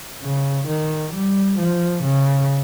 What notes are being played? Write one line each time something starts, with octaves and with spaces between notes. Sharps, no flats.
C#3
D#3
G3
F3
C#3